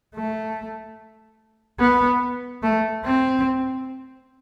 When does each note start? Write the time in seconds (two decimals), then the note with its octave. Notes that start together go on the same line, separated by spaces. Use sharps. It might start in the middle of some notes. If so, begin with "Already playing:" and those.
0.16 A3
1.80 B3
2.63 A3
3.05 C4